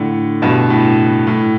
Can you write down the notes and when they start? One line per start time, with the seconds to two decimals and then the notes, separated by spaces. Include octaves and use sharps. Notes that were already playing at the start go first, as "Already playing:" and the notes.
Already playing: A2 D3
0.42 G2 B2
0.70 A2
1.27 A2